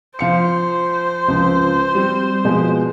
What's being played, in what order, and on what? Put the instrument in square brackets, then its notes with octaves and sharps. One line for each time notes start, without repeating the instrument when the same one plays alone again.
[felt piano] F3 F5 C#7 [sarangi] C5
[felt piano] C#2 F3
G3 C4
B2 F3 G#3